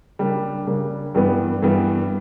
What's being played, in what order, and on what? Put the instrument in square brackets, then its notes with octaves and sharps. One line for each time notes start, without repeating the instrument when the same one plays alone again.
[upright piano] C#3 G3 A#3 D4
C#3 G3 A#3 D4
G2 E3 G3 B3
G2 E3 G3 B3